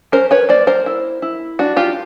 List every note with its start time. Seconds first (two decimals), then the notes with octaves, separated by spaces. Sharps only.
0.12 C#4 A#4 C5
0.31 B4 C#5
0.49 A#3 C5 D5
0.67 A#4 C5
0.86 E4
1.22 E4
1.59 D4 F#4
1.77 F4 G4